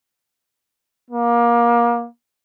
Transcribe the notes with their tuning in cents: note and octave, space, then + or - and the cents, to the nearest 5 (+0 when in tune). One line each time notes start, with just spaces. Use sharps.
A#3 +25